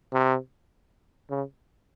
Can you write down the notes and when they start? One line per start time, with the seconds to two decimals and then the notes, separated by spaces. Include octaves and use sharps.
0.13 C3
1.30 C#3